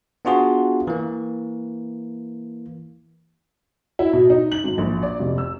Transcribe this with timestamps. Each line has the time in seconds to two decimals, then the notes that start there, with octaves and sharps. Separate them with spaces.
0.25 B3 D4 F4 F#4 G#4
0.87 E3 A#3
3.99 E4
4.13 B2
4.30 D#4
4.52 F#7
4.64 G#1
4.78 A#1
5.03 D5
5.20 F1
5.38 E6